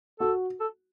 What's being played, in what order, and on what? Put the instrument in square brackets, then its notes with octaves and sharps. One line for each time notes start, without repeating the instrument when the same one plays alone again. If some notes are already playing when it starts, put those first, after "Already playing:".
[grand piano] F#4 [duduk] A4
[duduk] A4